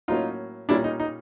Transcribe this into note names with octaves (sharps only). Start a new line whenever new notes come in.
A2 F#3 A#3 C#4 D#4 F4
A#2 G3 A#3 C#4 D4 E4
D#4
D#4